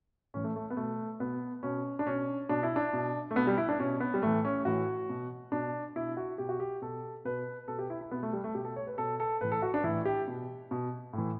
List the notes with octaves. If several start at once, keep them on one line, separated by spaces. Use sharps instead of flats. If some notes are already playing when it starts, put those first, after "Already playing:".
A2 E3 C#4
A3
A3
B3
B2 A3
B2 B3
B2 C#4
D4
B2 C#4
B2 D4
E4
D4
B2
A3
B2 B3
G3
E4
D4
B2 C#4
B3
G3
A2 E3 A3
C#4
A2 E3 F#4
B2
B2 D4
B2 E4
F#4
B2 G4
F#4
G4
B2 A4
B2 B4
B2 A4
G4
E4
E4
B2 B3
A3
G3
A3
B2 G4
A4
C#5
B4
B2 A4
A4
A2 E3 B4
A4
F#4
D4
A2 E3 E4
G4
B2
B2
A2
E3